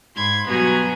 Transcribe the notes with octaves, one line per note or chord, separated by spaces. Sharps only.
G#2 B5 C6 G#6
G2 B2 F#3 B3 G#5 A#5